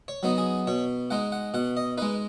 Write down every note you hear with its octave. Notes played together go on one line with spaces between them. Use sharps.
C#5
F#3 B3 D#4
G#4
B2 C#5
G#3 D#4 F#5
F#5
B2 F#5
D#5
G#3 D#4 B4